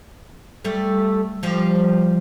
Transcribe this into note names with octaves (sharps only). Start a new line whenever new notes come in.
G3 A3
F3 G3